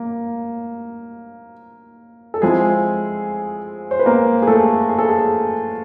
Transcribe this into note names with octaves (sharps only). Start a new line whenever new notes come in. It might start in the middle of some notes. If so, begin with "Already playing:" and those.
Already playing: A#3
A4
F3 G#3 C4 E4 G#4
C5
B4
A#3 A#4
G#4
A3 A4
G#4
A4
G#4